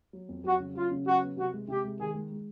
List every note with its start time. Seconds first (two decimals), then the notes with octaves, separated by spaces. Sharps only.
0.13 F#3
0.29 F2
0.44 F#3 F#4
0.60 C#3
0.75 F#3 F4
0.91 C#3
1.06 F#3 F#4
1.22 B3
1.37 C3 F#4
1.53 G#3
1.68 C3 G4
1.84 G#3
1.99 D#3 G#4
2.15 G#3
2.31 G#3